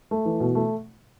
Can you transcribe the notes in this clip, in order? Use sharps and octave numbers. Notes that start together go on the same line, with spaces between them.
A3
E3
B2
A3